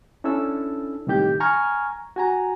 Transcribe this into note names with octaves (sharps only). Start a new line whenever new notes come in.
C#4 D4 E4 A4 E6
C2 A2 D#3 G4 G6
G#5 A#5 C#6 F6 G#6
F#4 G#5 A#5